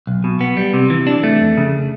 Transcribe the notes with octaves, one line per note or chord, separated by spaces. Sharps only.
B1
B2
B3
G3
C3
E3
D4
A3
F2
C#3